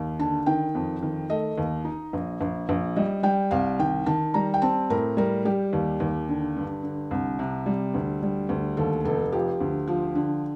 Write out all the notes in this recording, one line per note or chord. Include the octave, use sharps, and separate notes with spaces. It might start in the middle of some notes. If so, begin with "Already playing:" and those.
Already playing: D#2
D3 A5
D#3 G5
F2
D#3
A3 D#5
D#2
D#4
A#1
A#1
A#1
G3 D#5
G3 G5
C2 F5
D#3 G5
D#3 A5
G3 A#5
G5
C4 A5
A2 A#4
G3 A#4
G3 G4
D#2
D#2
D3
G2
D3
C2
C3
G3
D2
G3
D2
D#2 A4
F1 A4
F3 G4
D2
F3
D3